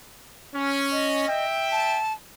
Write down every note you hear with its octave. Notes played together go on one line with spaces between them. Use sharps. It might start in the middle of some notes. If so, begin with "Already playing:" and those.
C#4
D#5
E5 G5
A5